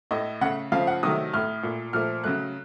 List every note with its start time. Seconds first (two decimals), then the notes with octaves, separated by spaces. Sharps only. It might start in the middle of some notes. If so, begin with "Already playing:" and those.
0.11 A2 A3 D#5
0.41 C#3 A3 F#5
0.72 C#3 F3 A3 F5
0.87 F#5
1.03 C3 D#3 F#3 A3 D#6
1.33 A2 A3 F6
1.63 A#2 A3
1.93 A#2 F3 A3 F6
2.24 C#3 F#3 A3 F#6